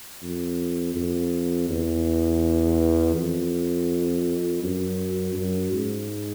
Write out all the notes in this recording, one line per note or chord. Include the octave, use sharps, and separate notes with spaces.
F2
F2
E2
F2
F#2
F#2
G#2